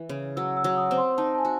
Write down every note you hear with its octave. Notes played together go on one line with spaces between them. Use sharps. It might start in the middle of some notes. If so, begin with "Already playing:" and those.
Already playing: E3
C#3
F#3 E6
E6
F#3
D#6
C4
C6
D#4 A5
A5
G#5
F#4